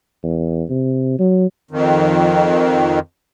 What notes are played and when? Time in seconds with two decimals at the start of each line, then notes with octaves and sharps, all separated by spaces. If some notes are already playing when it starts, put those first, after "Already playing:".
0.23 E2
0.70 C3
1.19 F#3
1.71 F2 D#3